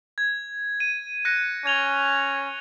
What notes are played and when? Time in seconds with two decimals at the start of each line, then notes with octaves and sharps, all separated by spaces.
0.18 G#6
0.80 D#7
1.25 F#6 A#6 C#7
1.66 C#4 G#6 F7 G7